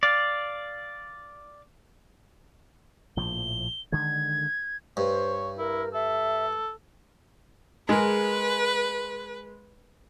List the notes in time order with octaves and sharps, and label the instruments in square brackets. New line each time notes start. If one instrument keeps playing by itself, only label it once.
[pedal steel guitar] D5 F5
[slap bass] A#1 A2 F3 [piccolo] G7
[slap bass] D3 D#3 G#3 [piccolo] G#6
[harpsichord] G2 [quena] C5 [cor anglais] C#5
[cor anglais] E4 [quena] A#4
[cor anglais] A4 [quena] E5
[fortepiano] G#3 [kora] G#4 A#4 [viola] B4